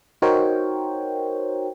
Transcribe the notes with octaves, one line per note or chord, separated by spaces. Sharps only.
D#4 F#4 A#4 C5 C#5 G5